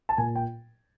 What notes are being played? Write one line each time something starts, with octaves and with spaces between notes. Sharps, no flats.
A5
A#2 G#5
G5